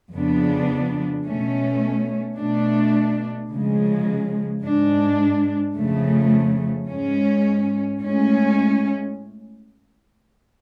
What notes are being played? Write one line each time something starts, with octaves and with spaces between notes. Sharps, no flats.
F2 C#3 F3 B3 D4
B2 A3 C#4
B2 A3 D4
C#3 F3 G#3
G#2 G#3 D4
F2 C#3 F3 A3
G#2 G#3 C#4
A2 G#3 C#4